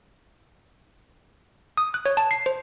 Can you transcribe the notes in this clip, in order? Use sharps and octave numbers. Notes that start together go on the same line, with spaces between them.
D#6
F#6
C#5
A5
C7
C5